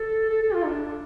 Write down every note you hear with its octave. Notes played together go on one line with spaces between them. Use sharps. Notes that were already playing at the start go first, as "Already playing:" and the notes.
Already playing: A4
A4
A4
F4
D4